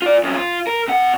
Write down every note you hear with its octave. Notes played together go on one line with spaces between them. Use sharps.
F4 D5
F2 C#4
F4
A#4
C3 F#5